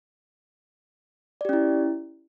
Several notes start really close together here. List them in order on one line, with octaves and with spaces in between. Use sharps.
D5 G4 C#4 E4